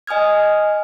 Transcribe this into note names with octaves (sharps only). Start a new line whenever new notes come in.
D#5 G#5 D#6 F6 G#6